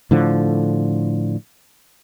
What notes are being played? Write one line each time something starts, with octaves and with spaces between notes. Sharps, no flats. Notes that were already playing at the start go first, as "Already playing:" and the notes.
A2 D3 F3